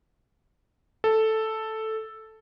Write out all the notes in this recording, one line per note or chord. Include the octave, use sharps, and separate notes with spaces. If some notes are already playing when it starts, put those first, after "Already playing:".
A4